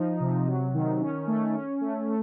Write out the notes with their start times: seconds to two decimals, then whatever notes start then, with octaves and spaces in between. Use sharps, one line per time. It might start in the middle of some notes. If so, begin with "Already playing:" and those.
Already playing: F3 D#4
0.20 C3
0.47 F#3
0.74 D#3
1.01 C#4
1.27 A3
1.54 C#4
1.81 A3
2.08 A3